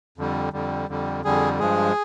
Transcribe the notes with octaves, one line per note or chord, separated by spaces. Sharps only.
F2 D3 G3
F2 D3 G3
F2 D3 G3
F2 D3 G3 G#4
G2 F3 G#3 G#4